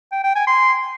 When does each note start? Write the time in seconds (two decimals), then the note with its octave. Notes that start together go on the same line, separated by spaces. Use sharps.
0.12 G5
0.24 G5
0.35 G#5
0.47 C6